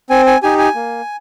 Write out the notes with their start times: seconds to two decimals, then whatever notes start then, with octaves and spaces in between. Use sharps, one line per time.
0.10 C4 G#5
0.26 G#5
0.43 D#4 G4 G#5
0.59 G#5
0.75 A#3